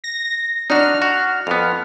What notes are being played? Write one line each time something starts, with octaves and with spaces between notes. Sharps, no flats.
A#6
D4 D#4 F#4 F6
F#4
F2 B3